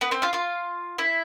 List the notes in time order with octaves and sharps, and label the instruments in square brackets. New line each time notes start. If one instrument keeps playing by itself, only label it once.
[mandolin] B3 B4
C4 C5
F4 F5
F4 F5
E4 E5